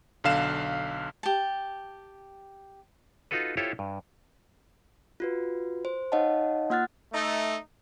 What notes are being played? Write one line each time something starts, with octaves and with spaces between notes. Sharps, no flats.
B1 D3 F5 E7
G4 A5
D#4 F4 F#4 A4 B4
E4 F4 G4 A4 C5 C#5
G2
F4 F#4 B4
C5
D#4 C#5 D#5 F5 F#5 A5
A#3 F4 F#5 F6 F#6 A6
A3 D#4